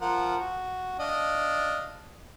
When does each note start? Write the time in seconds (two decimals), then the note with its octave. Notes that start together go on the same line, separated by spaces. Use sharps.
0.01 F3 A#4 F#5
0.40 F#4
1.00 D4 D#5 F5